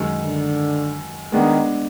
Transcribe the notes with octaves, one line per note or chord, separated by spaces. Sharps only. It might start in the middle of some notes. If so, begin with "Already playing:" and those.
Already playing: F#2 D#3 G#3
D3
D#3 G#3 B3 D4